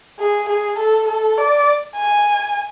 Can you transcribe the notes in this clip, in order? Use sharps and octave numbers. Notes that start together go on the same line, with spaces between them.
G#4
G#4
A4
A4
D5
G#5